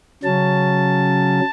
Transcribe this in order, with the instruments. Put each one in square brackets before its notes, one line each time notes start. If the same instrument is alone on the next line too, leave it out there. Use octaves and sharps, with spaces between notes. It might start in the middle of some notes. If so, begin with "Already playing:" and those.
[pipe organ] C#3 F#3 C#4 A5